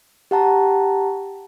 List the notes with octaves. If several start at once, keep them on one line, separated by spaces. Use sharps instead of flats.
G4 F#5 A5 A#5